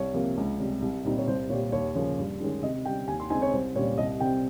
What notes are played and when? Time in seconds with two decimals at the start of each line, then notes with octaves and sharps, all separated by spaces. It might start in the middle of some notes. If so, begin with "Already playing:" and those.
Already playing: C2 C#5
0.14 C3 F3 A#3
0.37 C#2
0.59 C3 G3 C#4
0.82 C2
1.04 A#2 G3 C4 D#4
1.18 C#5
1.27 C2 C5
1.49 A#2 C#5
1.53 G3
1.72 D#2 C#5
1.95 C#3 F3 A#3 C#4
2.18 G2
2.40 D#3 G#3 C#4
2.63 C3 D#5
2.85 G3 G5
2.89 C#4
3.08 D#2 G#5
3.20 C6
3.30 C#3 G#3 C4 D#4 G#5
3.42 C#5
3.53 C2 C5
3.76 A#2 G3 C#4 C#5
3.98 C2 D#5
4.20 C3 G3 C4 G5